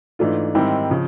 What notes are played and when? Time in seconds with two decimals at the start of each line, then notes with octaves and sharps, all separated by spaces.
0.19 G#2 E3 A3 D4 F4
0.55 G#2 D#3 G3 C4 E4
0.90 C#3 F3